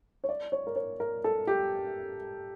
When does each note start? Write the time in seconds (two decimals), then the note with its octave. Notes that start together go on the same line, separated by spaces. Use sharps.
0.24 C#5
0.29 D5
0.52 C#5
0.67 A#4
0.76 C#5
1.00 A#4
1.24 A4
1.47 G4